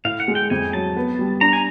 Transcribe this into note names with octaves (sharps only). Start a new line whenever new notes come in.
A2 F5
F#5
G#3
G5
F2 G#5
F#3 A5
B3
G3
D4 A#5
G#5